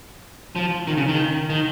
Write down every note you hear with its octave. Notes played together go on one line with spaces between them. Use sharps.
F3
D#3
C#3
D#3
D#3